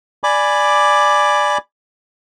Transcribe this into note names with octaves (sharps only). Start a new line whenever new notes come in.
D5 G#5 B5 D6